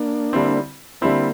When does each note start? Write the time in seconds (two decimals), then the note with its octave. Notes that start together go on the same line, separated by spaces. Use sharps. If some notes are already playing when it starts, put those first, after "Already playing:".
Already playing: A#3 D4
0.33 D3 G3 C4 E4
1.01 D3 G3 A#3 C4 E4